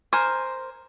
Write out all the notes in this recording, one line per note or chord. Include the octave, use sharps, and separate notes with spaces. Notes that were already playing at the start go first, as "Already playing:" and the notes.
A#4 C5 G#5